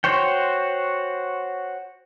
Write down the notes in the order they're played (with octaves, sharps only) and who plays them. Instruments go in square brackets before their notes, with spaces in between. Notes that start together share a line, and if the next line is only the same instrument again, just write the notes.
[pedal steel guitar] F#4 C5 C#5 G5